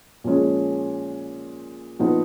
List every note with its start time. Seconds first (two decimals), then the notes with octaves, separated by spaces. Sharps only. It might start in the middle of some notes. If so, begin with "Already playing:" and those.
0.24 A#2 F3 G#3 C#4
1.99 A#2 F3 B3 D#4